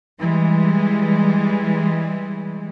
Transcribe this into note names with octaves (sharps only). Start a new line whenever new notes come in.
E3 G3 G#3